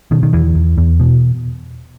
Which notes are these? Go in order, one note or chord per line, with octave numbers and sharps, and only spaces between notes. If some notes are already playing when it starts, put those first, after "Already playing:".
B2 D#3
D#3
E2 E3
E2
E2
B2